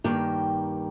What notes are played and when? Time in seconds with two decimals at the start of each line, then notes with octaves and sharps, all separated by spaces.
0.04 G2 D#3 A#3 G5